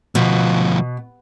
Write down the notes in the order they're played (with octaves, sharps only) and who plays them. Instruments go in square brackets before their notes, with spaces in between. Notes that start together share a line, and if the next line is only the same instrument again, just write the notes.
[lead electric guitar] D2 F3 [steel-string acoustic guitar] B2